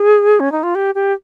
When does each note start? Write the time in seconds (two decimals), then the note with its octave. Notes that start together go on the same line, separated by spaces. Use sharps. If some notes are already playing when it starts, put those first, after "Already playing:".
Already playing: G#4
0.40 C#4
0.52 D#4
0.63 F4
0.75 G4
0.95 G4